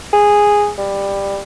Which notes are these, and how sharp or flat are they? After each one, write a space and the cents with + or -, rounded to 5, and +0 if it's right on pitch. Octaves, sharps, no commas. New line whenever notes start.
G#4 -5
G3 +15